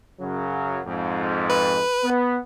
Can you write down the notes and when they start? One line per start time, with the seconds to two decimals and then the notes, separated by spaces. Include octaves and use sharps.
0.20 F#2 C#3 F#3
0.86 F2 G#2
1.50 B4
2.04 B3